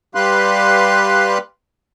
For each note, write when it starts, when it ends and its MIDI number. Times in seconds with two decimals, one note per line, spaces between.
0.15 1.38 55
0.15 1.38 67
0.15 1.38 71
0.15 1.38 77
0.15 1.38 84
0.15 1.38 90